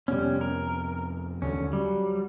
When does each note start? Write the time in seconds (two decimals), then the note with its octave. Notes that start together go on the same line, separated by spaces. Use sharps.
0.08 F2 C3 G3 B3 C#4
0.41 A#4
1.42 D#2 D3 F#3 C#4
1.73 F#3 G3